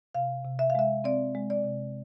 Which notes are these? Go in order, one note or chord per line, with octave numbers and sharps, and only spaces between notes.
C3 F5
C3
E5
F5
G#3 E5
C4 D5
G#3
D5
C3